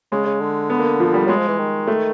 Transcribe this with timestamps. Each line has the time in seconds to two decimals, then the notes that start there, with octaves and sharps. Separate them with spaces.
0.12 C#3 G#3
0.26 C#3
0.41 D3
0.70 B3
0.79 A#3
1.00 F3
1.14 G3
1.26 F#3 G#3
1.37 F3
1.48 E3
1.58 D#3
1.87 A3